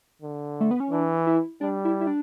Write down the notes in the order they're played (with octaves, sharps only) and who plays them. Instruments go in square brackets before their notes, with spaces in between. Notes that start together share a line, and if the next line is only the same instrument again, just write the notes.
[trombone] D3
[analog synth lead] A3
B3
C#4
[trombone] E3 [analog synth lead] D4
[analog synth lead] E4
[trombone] G3 [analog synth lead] D4
[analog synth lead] E4
E4
D4